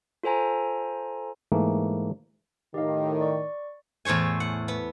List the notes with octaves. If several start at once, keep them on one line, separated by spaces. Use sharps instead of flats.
F4 A4 C5 G#5 A#5
G#2 E3 A3 A#3
A2 D#3 G4 D#5 F5
D5 C#6
E2 A2 C5 C#5 G#5
F#5
B3